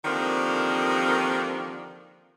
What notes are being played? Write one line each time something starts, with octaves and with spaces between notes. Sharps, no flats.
D3 D#3 F3 G3 A#3 C4